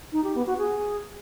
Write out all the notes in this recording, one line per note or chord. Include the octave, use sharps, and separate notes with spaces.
D#4
G4
B3
F#4
G#4